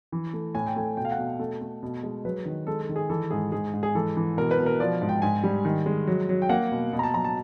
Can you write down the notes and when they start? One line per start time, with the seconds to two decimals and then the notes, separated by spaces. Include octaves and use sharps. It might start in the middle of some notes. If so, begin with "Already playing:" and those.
0.12 E3
0.33 A3
0.55 A2 G#5
0.66 G5
0.76 A3 G#5
0.97 B2 G5
1.05 F5
1.11 F#5
1.18 B2
1.39 A3
1.61 A3
1.83 B2
2.03 G#3
2.25 F#3 B4
2.45 D#3
2.67 G#3 A4
2.82 A4
2.89 D#3
2.96 G#4
3.10 E3 A4
3.30 G#2 G#4
3.52 G#2 G#4
3.74 G#2
3.83 G#4
3.95 E3 A4
4.17 E3
4.37 B2 A#4
4.51 B4
4.59 B2
4.66 A#4
4.80 F3 D5
5.01 G#2
5.09 G5
5.22 G#2 G#5
5.44 G3
5.65 D#3
5.86 G#3
6.07 F#3
6.29 F#3
6.42 G5
6.49 A#3 F#5
6.71 B2
6.93 B2
6.99 A#5
7.03 A5
7.14 F#3 A#5
7.24 A5